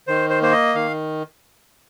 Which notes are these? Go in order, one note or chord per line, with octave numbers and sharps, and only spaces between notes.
D#3 C5
C5
A#3 C5
D#5
D#3 F5